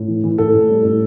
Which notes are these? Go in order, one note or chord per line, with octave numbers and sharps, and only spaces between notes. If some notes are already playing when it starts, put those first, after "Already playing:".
Already playing: A2
E3
E3
A2 A4
A2
G3
A2